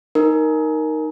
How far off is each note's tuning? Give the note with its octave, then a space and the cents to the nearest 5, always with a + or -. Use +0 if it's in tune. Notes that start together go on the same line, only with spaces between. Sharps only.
D#4 +0 A#4 +0